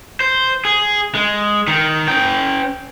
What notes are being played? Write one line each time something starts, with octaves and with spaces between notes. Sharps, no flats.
C5
G#4
G#3
D#3
C#4 G5